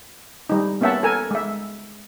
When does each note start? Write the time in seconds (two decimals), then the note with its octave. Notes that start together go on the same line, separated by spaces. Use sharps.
0.50 G3 D#4
0.81 A#3 B3 C#4 E5 F#5 A5
1.03 A4 A#4 G#5
1.31 G#3 E5